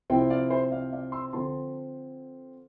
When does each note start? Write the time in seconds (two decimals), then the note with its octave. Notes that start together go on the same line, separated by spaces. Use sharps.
0.10 C3 F3 C4 E4 E5 G5
0.30 D5 F5
0.50 C5 E5
0.72 D5 F5
0.93 D5 F5
1.12 C6 E6
1.33 D3 F3 C4 A5 C6